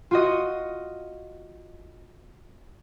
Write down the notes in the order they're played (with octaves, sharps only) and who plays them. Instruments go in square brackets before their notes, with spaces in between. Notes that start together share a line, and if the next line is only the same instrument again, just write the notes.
[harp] F4 F#4 D#5